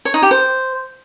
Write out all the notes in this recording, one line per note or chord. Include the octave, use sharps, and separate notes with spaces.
C#5
D#4
G4
C5